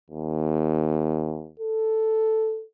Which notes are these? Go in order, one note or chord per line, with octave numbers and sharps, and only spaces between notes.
D#2
A4